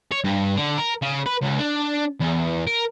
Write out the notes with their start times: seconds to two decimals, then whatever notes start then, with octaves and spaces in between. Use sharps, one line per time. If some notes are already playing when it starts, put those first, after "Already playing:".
0.12 C#5
0.24 G2
0.57 D3
0.78 A#4
1.02 C#3
1.26 B4
1.42 C#2
1.59 D4
2.20 E2
2.67 A#4